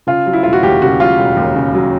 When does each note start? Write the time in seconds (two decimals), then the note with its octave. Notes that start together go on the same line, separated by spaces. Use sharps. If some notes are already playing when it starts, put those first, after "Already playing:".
0.07 C#3 F4
0.26 F#3
0.33 E4
0.43 E1 F4
0.53 F#4
0.63 D#2 G4
0.82 C#3 F#4
1.00 F#3 F4
1.19 E1
1.37 D#2
1.56 C#3
1.74 F#3